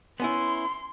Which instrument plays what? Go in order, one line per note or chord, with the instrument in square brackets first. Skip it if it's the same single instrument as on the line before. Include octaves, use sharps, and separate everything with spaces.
[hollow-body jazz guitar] B3 C#4 E4 [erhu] C6